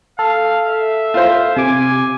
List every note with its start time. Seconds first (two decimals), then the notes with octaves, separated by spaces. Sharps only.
0.19 A4 F5
0.67 E5
1.14 F4 C5
1.57 C3 G#5 D6